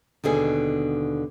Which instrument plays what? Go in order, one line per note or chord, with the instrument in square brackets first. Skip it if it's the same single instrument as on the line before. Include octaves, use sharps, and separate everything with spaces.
[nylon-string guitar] D#2 B2 D3 G#4